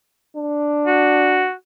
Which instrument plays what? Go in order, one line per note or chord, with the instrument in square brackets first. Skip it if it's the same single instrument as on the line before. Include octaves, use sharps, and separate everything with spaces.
[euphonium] D4
[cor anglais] F#4